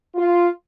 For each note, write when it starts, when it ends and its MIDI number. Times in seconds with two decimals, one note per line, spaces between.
0.15 0.47 65